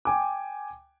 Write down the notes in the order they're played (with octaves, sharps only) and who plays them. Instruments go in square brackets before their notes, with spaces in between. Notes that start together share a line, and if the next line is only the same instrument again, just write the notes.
[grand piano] G5 G#5 D6